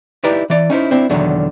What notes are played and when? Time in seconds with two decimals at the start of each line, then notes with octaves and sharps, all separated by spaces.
0.24 D#4 E4 G4 B4 D5
0.50 E3 D5
0.70 C#4 D#4 E4 C5
0.91 C4 D4 E4
1.10 E2 B2 D3 D#3 F#3